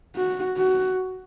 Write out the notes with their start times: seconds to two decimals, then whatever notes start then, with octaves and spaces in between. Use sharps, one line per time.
0.16 F#4
0.58 F#4